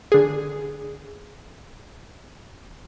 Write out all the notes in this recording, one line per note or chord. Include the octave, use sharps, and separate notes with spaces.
D3 G#4